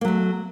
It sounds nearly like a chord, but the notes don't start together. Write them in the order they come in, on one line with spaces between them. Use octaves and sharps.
A#3 F#3 A3